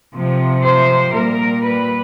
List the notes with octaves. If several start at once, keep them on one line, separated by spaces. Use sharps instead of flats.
C3 F3
C5
A#2 G3 A#4
B4